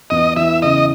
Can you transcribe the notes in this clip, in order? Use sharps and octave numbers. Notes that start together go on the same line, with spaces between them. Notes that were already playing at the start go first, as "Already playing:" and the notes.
E2 D#5
E3 E5
C#3 D#5